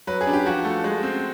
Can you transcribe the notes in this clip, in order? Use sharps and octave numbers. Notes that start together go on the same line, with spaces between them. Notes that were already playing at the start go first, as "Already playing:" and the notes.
F#3 B4
G#4
D4
G4
F3 F#4
A3
G#3
C4